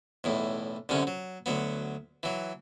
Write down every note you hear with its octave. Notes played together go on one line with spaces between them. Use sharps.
B1 E2 A2
C2 F#2 D3 C#4
F#3
D2 F#3 B3
E3 F#3